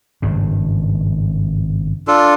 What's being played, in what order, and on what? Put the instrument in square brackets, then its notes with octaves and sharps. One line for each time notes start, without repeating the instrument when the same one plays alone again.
[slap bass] G#1 G2 C#3
[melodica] D4 F4 A4